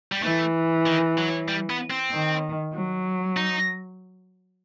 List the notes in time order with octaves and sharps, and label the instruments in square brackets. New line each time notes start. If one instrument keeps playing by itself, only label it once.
[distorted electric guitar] G3
[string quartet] E3 [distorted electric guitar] A3
[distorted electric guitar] D#3
F#3
G3
B3
C4
[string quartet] D#3
F#3
[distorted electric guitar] D#4